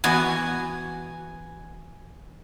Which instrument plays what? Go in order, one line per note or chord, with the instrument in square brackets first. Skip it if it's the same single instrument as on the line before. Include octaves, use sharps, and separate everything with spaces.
[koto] E3 B3 F#4 [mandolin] G#5